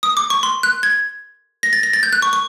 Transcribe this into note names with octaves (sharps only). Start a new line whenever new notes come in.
D#6
D6
C#6
C6
F#6
G#6
A#6
A6
A#6
A6
G6
F#6
C#6
C#6